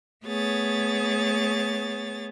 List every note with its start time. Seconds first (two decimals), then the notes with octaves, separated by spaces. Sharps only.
0.24 A3 B3 G#4 C#5 A6